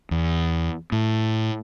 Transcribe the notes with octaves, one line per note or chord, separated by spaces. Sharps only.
E2
A2